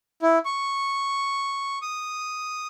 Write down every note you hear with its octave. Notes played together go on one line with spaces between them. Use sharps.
E4
C#6
D#6